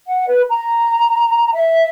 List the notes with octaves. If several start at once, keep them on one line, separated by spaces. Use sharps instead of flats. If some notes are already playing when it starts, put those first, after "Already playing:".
F#5
B4
A#5
E5